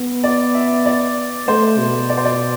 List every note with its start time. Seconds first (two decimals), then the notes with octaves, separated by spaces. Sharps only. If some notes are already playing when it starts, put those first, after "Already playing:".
Already playing: B3
0.24 D5
0.54 E5
0.86 D5
1.48 A3 C5
1.79 B2
2.10 D5
2.17 C5
2.25 D5